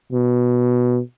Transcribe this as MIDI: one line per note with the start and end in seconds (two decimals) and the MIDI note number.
0.12 1.00 47